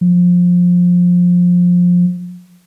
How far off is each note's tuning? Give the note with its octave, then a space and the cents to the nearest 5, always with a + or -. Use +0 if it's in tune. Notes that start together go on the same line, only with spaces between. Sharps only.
F3 +20